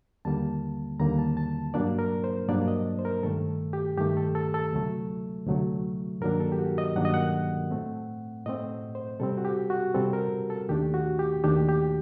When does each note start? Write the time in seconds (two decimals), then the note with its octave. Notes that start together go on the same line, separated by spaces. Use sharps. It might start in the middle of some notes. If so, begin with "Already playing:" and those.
0.25 D#2 D3 G3 A#3 A5
1.00 D#2 D3 G3 A#3 A#5
1.18 A5
1.37 A5
1.74 G2 F#3 A#3 D4 D5
1.99 A#4
2.24 C5
2.49 G2 F#3 A#3 D4 D5
2.68 D#5
2.99 C5
3.05 A#4
3.23 G2 D#3 A3 A4
3.73 G4
3.98 G2 D#3 A3 G4
4.17 A4
4.35 A4
4.54 A4
4.73 D2 C3 F#3 A3
5.47 D2 C3 F#3 A3
6.21 G2 D#3 F#3 A#3 D4 A#4
6.40 A4
6.52 G4
6.59 F#4
6.78 D#5
6.96 G2 D#3 F#3 A#3 D4 F#5
7.05 D#5
7.14 F#5
7.71 A2 A3 C4
8.46 A2 A3 C4 D#5
8.95 C5
9.20 C3 G3 C4 A4
9.38 F#4
9.45 G4
9.70 F#4
9.94 C3 G3 C4 A4
10.13 A#4
10.50 A4
10.69 D#2 D#3 A3 D4 G4
10.94 F#4
11.19 G4
11.44 D#2 D#3 A3 D4 G4
11.69 G4